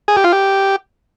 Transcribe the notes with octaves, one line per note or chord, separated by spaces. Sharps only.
G#4
G4
F4
G4